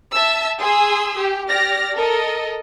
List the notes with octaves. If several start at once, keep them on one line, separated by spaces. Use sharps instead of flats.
E5 A5 E6
G#4 G#5 C6 D#6 E6
G4
G4 D5 F6 A#6
A4 A#4 D#5